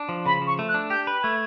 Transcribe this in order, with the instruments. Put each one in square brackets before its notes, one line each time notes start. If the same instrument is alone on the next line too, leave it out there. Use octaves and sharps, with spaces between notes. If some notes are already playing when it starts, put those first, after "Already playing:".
Already playing: [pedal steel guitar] D4
F3
[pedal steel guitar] C#3 [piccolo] B5
[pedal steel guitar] F3
[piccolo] C#6
[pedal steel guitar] A3
[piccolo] F#6
[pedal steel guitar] D4
[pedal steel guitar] G4 [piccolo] G6
[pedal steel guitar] B4
[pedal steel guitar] A3 [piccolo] G#6